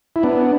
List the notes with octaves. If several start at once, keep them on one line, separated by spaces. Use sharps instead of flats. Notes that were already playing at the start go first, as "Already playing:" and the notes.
E4
B3 D4